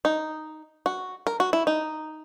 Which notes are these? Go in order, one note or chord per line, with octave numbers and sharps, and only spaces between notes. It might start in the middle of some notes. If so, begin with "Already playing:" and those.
D#4
F#4
A#4
F#4
E4
D#4